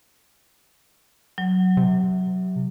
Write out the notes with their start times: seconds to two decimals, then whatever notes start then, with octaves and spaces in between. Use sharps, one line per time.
1.38 F#3
1.77 C3